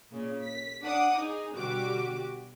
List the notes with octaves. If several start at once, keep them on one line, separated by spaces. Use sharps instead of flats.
A#2 C#3
B6
D4 F#5 D6 D#6
D#4 G#4
B2 D3 G3 F#4 G4 D6